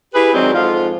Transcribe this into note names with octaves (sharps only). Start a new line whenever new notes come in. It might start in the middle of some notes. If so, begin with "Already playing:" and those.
E4 G4 G#4 B4
D#3 F#3 G#3 C4 D4
F2 G#2 F3 F4